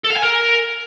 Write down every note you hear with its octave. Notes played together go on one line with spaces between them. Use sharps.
A4
F5
G#5
A#4